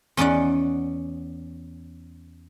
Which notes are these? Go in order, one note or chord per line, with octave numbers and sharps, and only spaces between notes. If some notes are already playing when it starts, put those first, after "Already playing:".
E2 C#4 D#4 D5 F#5